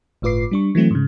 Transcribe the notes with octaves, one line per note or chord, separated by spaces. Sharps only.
G1 A2 F4 B4 D6 C7
G3 D4 C#6
E3 F#3 A3 C4
G#2 C#3